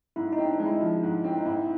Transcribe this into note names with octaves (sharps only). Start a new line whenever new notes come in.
G#2 E4
D#4
C4
D4
G#3
E4
F3
G#2
C4
D#4
G#2 E4